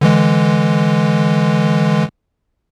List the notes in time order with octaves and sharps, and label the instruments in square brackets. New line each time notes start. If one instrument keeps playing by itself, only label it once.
[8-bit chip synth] D3 E3 G#3